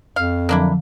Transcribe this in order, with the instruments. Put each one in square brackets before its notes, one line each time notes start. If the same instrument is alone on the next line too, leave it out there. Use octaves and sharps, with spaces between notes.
[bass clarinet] F2 [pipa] F5
[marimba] D3 F3 F#3 [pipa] A#3 D4 E4